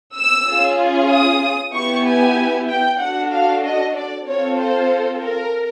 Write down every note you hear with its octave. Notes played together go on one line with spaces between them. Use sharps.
E6
C#4 F4 G#4
D#6
B3 E4 G4 C#6
G#5
G5
D4 F#4 A4 F#5
F5
D#5
D5
C4 F4 A4 C#5
C5
A#4